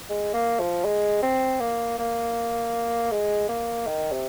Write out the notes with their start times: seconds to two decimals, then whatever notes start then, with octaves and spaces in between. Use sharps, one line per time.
0.09 G#3
0.34 A#3
0.59 F3
0.85 G#3
1.22 C4
1.60 A#3
1.99 A#3
3.11 G#3
3.49 A#3
3.87 D#3
4.12 C3